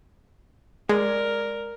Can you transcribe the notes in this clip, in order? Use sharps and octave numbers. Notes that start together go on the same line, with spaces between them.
G#3 A#4 D5